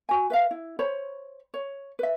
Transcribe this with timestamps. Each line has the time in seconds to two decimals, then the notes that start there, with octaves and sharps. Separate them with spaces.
0.09 F#4 G#5
0.30 B4 E5 F5
0.51 E4
0.79 C5 C#5 B5
1.54 C#5
1.99 B4 E5